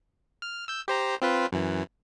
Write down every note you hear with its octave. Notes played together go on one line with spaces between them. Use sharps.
F6
E6 G6
G4 C5 A#5
C4 F4 B4
F#2 E3